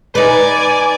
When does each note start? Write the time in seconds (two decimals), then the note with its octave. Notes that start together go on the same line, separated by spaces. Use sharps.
0.15 D#4 B4 D5 G#5